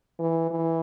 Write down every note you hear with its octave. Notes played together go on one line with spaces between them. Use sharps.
E3
E3